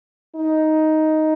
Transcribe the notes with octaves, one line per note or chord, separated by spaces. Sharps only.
D#4